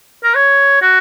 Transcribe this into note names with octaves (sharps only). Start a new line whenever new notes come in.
A#4
C#5
F#4